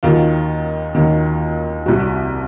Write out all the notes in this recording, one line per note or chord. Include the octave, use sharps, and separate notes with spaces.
D#2 D#3 F#3 F4
D#2 D#3 F#3
C2 C3 F#3 F#4